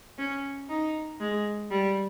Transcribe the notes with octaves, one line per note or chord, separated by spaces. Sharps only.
C#4
D#4
G#3
G3